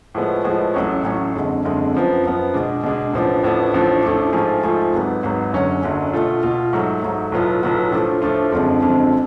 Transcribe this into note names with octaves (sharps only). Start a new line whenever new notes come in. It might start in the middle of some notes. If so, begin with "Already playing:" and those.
A2 F3 G#3 B3
A2 F3 G#3 B3
A1 A2 F#3 C#4
A1 A2 F#3 C#4
F#1 F2 D3 G#3
F#1 F2 D3 G#3
F#2 F3 B3
F#2 F3 B3
B2 G#3 D4
B2 G#3 D4
A1 A2 F3 B3 D4
A1 A2 F3 B3 D4
A1 A2 F3 A3 D4
A1 A2 F3 A3 D4
G#2 F3 A3 F4 G#4
G#2 F3 A3 F4 G#4
G#1 G#2 F#3 B3
G#1 G#2 F#3 B3
F#1 F#2 D3 F#3 C#4
F#1 F#2 D3 F#3 C#4
B2 A3 F4
B2 A3 F4
G#2 F#3 A3
G#2 F#3 A3
B1 A2 F#3 B3 F4
B1 A2 F#3 B3 F4
A2 F3 A3 D4 F4
A2 F3 A3 D4 F4
F#1 F2 D3 F3 G#3
F#1 F2 D3 F3 G#3